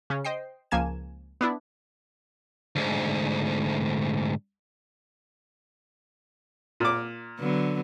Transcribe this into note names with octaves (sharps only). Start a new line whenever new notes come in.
C#3 C#4
C5 D#5 G5 C7
C#2 F3 A#3 G#5 G#6 E7
B3 D4 E4
D2 G#2
A#2 D6
D3 F#3 B3